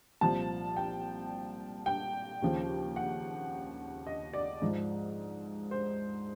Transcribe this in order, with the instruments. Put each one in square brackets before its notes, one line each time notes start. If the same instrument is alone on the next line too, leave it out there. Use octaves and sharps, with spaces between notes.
[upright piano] C2 A#2 F3 A5
G5
G5
D#2 C#3 F3
F#5
D#5
D5
G#2 F3
C5